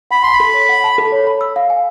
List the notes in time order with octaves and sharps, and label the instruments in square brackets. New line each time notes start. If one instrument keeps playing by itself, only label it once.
[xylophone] F#5 [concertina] B5
[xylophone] A5 [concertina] C6
[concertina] B5
[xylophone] A4
C#5
F#5
A5
A4
C#5
B5
E6
F5
G#5